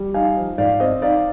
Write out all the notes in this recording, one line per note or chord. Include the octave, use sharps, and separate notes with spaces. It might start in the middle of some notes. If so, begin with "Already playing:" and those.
Already playing: G3
D#4 F5 G#5
F3
G#2 D5 F5
C4 C5 D#5
D#4 D5 F5